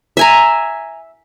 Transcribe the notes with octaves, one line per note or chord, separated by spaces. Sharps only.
E5 G#5 A#5